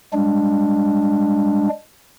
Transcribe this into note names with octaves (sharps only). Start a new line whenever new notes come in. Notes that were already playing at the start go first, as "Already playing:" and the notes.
G3 G#3 D4